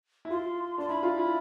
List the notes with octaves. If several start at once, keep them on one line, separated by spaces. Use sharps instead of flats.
E4
F4 C6
D4 C6
E4 B5
F4
E4